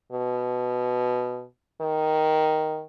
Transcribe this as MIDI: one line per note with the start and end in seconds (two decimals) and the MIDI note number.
0.12 1.43 47
1.81 2.82 51